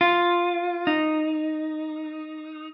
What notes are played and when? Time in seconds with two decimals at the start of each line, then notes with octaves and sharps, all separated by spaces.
0.01 F4
0.87 D#4